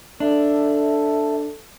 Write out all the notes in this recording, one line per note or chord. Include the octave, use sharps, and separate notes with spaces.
D4 A4 E5